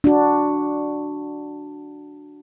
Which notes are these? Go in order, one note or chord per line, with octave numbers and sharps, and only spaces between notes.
D4 F#4